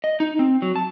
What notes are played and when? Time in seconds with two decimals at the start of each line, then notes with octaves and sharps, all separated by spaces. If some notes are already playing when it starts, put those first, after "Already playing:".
0.04 D#5
0.20 D#4
0.39 C4
0.62 F#3
0.76 A5